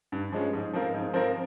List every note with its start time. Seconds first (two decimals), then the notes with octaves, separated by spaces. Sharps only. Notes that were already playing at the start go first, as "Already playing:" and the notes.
0.12 G2
0.32 F3 G#3 C#4
0.53 G#2
0.73 F3 C4 F4 A#4
0.94 G#2
1.13 F3 C4 F4 A#4